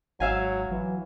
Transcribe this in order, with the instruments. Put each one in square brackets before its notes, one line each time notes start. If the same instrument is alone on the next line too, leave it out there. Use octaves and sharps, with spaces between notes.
[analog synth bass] G#1 [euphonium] F#3 [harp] E5 F5 G#5
[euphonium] E3 [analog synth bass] F#3